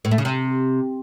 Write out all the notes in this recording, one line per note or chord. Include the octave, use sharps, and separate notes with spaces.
A2
A3
C#3
C3